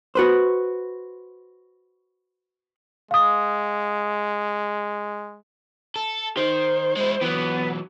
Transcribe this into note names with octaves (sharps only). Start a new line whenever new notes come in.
F#4 B4 C5
G#3 F5 D#6
A4
D#3 C5
G#3 E4
E3 F#3 B3